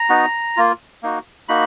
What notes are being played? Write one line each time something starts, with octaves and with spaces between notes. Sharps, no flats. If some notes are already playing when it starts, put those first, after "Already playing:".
Already playing: A#5
B3 D#4 F#4
A#3 F4
A#3 D#4 F#4
A#3 D#4 F#4 B5